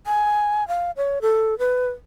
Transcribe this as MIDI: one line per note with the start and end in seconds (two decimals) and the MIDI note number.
0.07 0.67 80
0.68 0.91 77
0.97 1.19 73
1.22 1.58 69
1.59 1.88 71